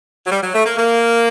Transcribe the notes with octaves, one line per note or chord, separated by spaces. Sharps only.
F#3
G3
F#3
A3
A#3
A#3